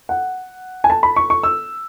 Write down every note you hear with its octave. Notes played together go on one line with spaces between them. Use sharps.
F#5
G#5
A5
B5
C#6
C#6
E6